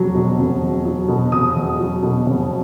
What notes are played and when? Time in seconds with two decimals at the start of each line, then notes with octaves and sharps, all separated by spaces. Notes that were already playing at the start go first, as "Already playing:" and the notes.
Already playing: F1 E2 F#3
0.14 B2
0.38 F1
0.62 E2
0.85 F#3
1.08 B2
1.32 F1 D#6
1.55 E2
1.79 F#3
2.03 B2
2.26 F1